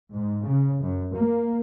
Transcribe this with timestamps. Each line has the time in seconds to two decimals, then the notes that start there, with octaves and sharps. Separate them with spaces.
0.14 G#2
0.45 C#3
0.82 F#2
1.13 A#3